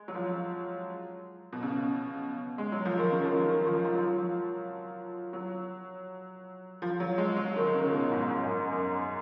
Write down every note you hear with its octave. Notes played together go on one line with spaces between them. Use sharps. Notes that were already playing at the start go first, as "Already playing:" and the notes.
Already playing: G#3
F#3
F3
B2
C#3
G#3
F#3
F3
D#3
C#3
F3
D#3
D#3
F3
F3
F#3
F3
F#3
F3
F#3
G#3
F#3
D#3
D#3
C#3
B2
G#2
G#2
F#2
F#2